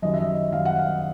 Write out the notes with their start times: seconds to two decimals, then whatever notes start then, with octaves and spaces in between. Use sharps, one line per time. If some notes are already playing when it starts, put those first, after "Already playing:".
0.02 F#2 D#3 G3 D#5
0.14 E5
0.19 D#5
0.52 F#2 D#3 G3 F5
0.65 F#5
0.78 F5